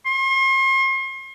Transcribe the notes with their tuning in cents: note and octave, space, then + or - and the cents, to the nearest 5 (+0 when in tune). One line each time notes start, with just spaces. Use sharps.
C6 +40